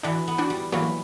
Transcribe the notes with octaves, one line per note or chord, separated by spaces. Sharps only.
E3 D4 F#4
B3
D4 F#4
G3
E3 F#3 A#3